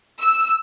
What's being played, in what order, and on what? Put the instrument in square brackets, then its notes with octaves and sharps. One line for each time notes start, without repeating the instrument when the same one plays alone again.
[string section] E6